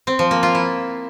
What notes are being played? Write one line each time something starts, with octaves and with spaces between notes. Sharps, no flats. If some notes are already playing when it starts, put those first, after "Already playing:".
C4
F3
A#3
F4
E4